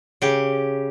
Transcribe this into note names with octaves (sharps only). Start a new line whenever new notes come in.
C#3 G4